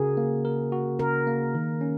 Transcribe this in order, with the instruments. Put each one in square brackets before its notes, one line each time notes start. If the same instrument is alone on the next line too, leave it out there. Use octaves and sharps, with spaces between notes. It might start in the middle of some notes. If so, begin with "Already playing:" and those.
Already playing: [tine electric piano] C#3 F#4 A#4 [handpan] G#4
[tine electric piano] A#3
A#4
F#4
[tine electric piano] C#3 [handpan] A#4
[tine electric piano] A#3
D#3
C#4